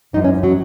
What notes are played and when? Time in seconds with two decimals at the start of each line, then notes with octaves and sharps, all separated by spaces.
0.13 F#2 E3 D#4
0.24 C#4
0.43 F#3